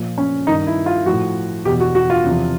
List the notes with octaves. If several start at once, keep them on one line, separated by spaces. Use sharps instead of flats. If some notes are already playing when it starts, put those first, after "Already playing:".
Already playing: A#2 F3
C#4
G2 D#3 D#4
E4
F4
A2 F3 F#4
E2 B2 G4
F#4
F#4
F4
E2 C3 F3